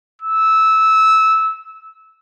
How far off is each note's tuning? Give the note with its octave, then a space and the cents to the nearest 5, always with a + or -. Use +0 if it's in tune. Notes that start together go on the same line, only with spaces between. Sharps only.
E6 -15